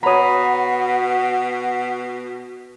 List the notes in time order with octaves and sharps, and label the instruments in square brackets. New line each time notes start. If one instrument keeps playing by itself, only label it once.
[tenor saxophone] B2 [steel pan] C#5 A#5 [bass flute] F#5 [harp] B5 D#6